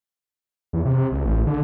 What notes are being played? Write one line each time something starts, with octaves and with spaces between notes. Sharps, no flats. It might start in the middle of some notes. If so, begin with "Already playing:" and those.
E2
C3
C3
C#2
A1
D3